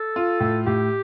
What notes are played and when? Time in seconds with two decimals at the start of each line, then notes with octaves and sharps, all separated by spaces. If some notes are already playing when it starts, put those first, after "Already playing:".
Already playing: A4
0.16 F4
0.40 A2
0.66 A2 G4